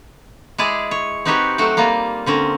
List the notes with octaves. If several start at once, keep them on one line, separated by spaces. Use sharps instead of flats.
G#3 E4 G#4 D5
C#5
C4 D#4 F#4 G4 B4 C#5
F#3 A3 F#4 C5
G3 A#3 F4 A#4
D3 C4 C#4 A#4